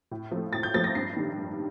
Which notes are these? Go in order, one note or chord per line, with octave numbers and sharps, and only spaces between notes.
A2
F3 A3
A2 A6
G6
F3 A3 A6
A#6
G2 C7
D#3 G3
G2